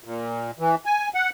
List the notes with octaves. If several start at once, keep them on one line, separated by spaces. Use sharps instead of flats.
A#2
E3
G#5
F#5